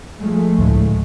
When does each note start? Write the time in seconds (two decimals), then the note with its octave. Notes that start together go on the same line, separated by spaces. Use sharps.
0.20 F3 G#3 A3
0.59 D2 A2